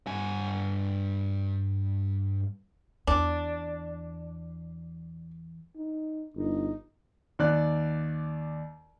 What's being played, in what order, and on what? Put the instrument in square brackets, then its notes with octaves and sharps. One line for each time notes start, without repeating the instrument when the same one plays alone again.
[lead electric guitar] G2 G#5
[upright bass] E2 [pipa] D4
[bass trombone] D#4
[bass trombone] G1 [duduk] D#4
[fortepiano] D#2 D5 F#6